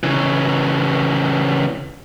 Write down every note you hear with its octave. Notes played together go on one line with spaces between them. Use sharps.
C#3 E3